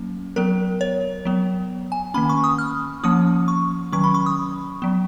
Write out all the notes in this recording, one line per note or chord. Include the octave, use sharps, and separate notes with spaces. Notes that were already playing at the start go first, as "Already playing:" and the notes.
Already playing: F#3 A#3 C#4
F#3 B3 A#4
C#5
F#3 B3
G#5
D#3 A#3 C#4 B5
C#6
D#6
F6
F3 A#3 C#4 D#6
C#6
D#3 F#3 C#4 C#6
B5
C#6
D#6
F#3 B3